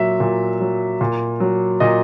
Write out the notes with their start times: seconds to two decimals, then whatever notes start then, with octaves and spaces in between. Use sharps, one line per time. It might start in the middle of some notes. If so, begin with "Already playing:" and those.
Already playing: A#2 F#3 E5
0.20 A#2
0.60 F#3
1.01 A#2
1.40 F#3
1.80 A#2 D#5